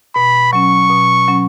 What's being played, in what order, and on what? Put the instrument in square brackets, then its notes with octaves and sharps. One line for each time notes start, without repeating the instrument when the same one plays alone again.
[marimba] B2 [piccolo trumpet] B5
[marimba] F#3 C#4 [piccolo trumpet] C#6
[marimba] B2
F#3 C#4